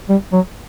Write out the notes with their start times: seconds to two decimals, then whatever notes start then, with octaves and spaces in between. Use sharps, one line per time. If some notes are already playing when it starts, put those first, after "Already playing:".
0.09 G3
0.32 F#3